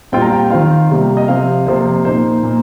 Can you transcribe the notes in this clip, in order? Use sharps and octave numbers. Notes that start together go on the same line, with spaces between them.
A#2 G3 C4 F4 G5
A#5
G5
D#3 C4 F4 F5
C3 G3 A#3
D#5
C3 F3 C4 F5
C3 F3 A#3 C5
C5
A#2 A#3 D#4 C5
A#2 A#3